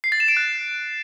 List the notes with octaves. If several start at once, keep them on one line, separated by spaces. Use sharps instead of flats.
C7
A6
E7
D7
F#6